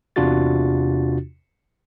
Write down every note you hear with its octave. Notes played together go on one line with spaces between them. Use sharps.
E2 C3 D4 F4 F#4 A6